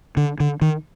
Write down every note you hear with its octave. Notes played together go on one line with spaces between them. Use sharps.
D3
D3
D#3